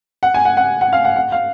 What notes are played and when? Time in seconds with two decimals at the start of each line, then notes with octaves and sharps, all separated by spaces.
0.23 F#5
0.34 G#5
0.45 F#5
0.57 F#5
0.81 F#5
0.93 F5
1.05 F#5
1.16 F#5
1.32 F5